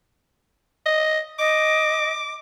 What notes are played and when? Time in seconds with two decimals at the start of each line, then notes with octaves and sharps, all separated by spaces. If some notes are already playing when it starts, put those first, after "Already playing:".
0.86 D#5
1.39 D#5 D6